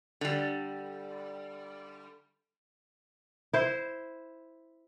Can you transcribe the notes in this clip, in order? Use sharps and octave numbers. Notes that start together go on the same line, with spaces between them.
D3 G3
E4 C5